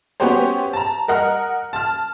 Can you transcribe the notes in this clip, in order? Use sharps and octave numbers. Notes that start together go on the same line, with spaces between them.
B3 C#4 F#4 G4 C5 C#5
A5 A#5
A#4 D#5 F#5 F6
A5 F6